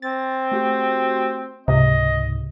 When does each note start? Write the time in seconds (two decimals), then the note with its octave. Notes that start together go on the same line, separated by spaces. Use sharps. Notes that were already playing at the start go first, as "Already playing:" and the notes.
0.02 C4 A6
0.52 A3 F#4 G4
1.68 C#2 G#2 C3 D#5